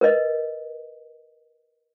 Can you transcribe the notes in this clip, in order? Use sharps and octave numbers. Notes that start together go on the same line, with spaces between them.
A#4 B4 D#5